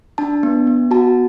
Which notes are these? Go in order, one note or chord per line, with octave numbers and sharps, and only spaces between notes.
D4 A5
B3
B3
F#4 A5